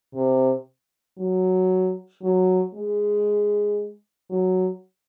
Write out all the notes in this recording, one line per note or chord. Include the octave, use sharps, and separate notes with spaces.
C3
F#3
F#3
G#3
F#3